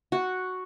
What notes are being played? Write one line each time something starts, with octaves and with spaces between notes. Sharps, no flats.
F#4